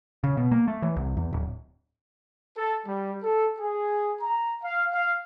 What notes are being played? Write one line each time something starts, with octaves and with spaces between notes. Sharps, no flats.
C#3
B2
A#3
A3
E3
C2
E2
D1
A4
G3
A4
G#4
A#5
F5
F5